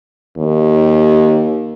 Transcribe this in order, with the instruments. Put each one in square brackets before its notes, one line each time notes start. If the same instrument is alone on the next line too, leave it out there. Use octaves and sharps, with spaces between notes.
[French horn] D#2